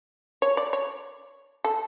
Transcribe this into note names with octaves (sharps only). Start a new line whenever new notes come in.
C#5
D5
C#5
A4